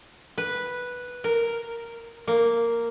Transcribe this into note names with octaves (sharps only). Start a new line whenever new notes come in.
B4
A#4
A#3